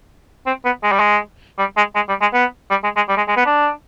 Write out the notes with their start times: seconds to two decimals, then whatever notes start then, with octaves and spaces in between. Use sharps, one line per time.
0.46 C4
0.65 B3
0.83 G#3
0.92 G3
0.99 G#3
1.59 G3
1.77 G#3
1.95 G#3
2.09 G3
2.21 G#3
2.33 B3
2.70 G3
2.83 G#3
2.96 G#3
3.09 G3
3.17 G#3
3.28 G#3
3.37 B3
3.46 D4